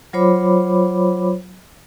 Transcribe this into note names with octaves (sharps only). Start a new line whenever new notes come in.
F#3 F4 C5 C#5 B5 D6